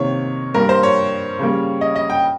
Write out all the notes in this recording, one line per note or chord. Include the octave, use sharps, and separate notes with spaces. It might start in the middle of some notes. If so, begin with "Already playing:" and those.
Already playing: C3 D#3 A#3 C#5
G2 G3 A#3 A#4
C5
C#5
C#3 G3 A#3
D#5
D#5
G5